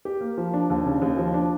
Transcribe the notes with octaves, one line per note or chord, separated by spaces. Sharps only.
G4
A#3
F3
D4
D#2
C#3
D#2
F3
D4